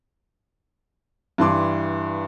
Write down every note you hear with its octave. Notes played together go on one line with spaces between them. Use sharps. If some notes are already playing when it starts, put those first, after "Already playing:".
G2 E3 C6 D6